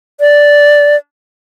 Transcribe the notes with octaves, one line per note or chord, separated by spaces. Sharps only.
D5